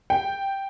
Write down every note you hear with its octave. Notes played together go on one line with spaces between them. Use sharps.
G5